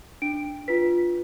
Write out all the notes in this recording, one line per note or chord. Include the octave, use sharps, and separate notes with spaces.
D4 D7
F4 B4 B6